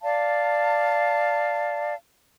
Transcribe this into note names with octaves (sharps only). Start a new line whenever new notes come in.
D5 F5 A5